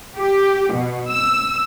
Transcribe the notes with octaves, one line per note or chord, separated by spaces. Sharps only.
G4
B2
E6